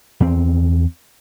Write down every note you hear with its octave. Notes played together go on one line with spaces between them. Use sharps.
E2 C4